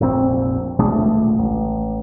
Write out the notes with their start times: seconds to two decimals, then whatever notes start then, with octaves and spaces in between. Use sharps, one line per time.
0.01 F1 A#1 B2 C4
0.79 A#1 B2 G#3 D4
0.91 D#1 C#2 A3
1.38 A1